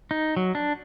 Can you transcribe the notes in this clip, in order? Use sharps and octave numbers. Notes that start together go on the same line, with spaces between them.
D#4
F#3
D4